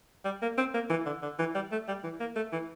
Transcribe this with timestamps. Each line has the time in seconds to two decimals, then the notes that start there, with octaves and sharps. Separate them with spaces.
0.25 G3
0.42 A#3
0.58 C4
0.74 A#3
0.90 E3
1.06 D3
1.23 D3
1.39 E3
1.55 G3
1.72 A3
1.88 G3
2.04 E3
2.20 A#3
2.36 A3
2.52 E3